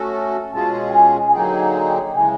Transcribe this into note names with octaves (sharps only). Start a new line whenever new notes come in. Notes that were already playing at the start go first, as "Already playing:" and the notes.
Already playing: A3 C#4 F#4 A4
A5
B2 G#3 C#4 F4 G#4 A5
G5
G#5
G#5
D3 F#3 A#3 D#4 G#4 G5
G5
F#5
G5
C#3 E3 G#3 G#5